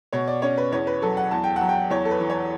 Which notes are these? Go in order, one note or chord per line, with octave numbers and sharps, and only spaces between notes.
B2 C#5
D5
C#4 C#5
B4
E2 C#5
B4
F#3 A4
F#5
E2 A5
G5
F#3 F#5
G5
E2 C#5
A4
B4
E3
C#5